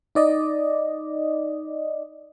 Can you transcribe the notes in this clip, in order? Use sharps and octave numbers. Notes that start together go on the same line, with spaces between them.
D#4 D5 D#5